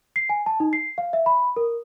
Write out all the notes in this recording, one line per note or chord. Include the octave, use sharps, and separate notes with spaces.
C7
G#5
A5
D#4
C7
F5
E5
B5
A#4